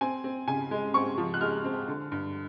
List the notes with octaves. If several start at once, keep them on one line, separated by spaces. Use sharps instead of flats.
C4 G#5
C4
C#3 G#5
G#3
C4 C#6
F3
F#6
G#3 F6
C4
D3
G2